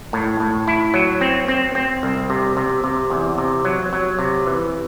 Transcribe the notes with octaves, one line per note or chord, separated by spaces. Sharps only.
A2
A2
E4
F#3
C4
C4
C4
C2
C3
C3
C3
E2
C3
F#3
F#3
C3
E3